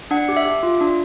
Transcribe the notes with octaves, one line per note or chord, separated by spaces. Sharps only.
D4 F#5
G4
E5
G4
F4
D4